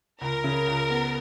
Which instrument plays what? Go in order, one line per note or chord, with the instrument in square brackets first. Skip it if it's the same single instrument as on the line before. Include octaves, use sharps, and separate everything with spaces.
[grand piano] C#2 [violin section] A#4
[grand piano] C#3
C#2
B3